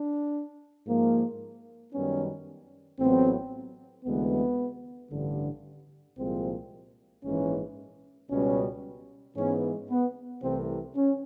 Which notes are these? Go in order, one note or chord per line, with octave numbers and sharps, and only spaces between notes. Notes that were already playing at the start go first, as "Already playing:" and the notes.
Already playing: D4
G#2 F3 A#3
F#2 D#3 G3 B3 C#4
A1 A2 F#3 B3 C4
D2 C3 E3 G#3 B3
A1 G2 D3
C2 A#2 F3 G#3 C4
A#1 G#2 E3 C#4
C#2 B2 G3 B3 C#4
G#2 E3 G#3 B3 C#4
B3
C2 C3 E3 A3 C4
C#4